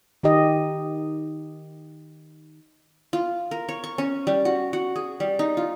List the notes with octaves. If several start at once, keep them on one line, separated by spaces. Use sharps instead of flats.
D#3 D#4 G4 D#5
F4
A#4
C#5
C#6
C#4
G3
F#4
F#4
G#4
G3
D#4
F4